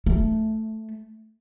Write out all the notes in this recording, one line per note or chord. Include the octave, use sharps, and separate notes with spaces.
A3